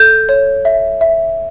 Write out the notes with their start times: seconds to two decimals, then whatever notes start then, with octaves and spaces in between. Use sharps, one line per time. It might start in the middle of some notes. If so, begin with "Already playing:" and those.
Already playing: A4 G6
0.29 C#5
0.65 E5
1.01 E5